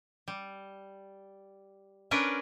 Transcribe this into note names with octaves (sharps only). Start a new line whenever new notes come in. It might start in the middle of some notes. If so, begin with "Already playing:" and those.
G3
C#4 D4 A#4 B4